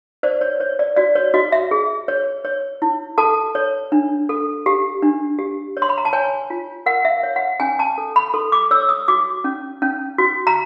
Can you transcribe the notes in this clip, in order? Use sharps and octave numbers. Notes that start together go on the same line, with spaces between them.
C5 D5
C#5
C5 C#5
D5
F#4 D5
C#5
F#4 D#5
E5
G#4
C#5
C#5
E4
A4 A5
C#5
D4
A4
G4
D4
G4
C#5
C6
B5
A#5
A5
C#5 G#5
F4
A#4 F#5
E5
F5
C#5
F#5
C#4 G#5
A5
A4
B5
A4 C6
D6
C#5 E6
D#6
F#4 D6
C#4
C#4
F#4
A#5